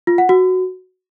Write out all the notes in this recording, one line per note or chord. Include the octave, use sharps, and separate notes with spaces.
F4
F#5
F#4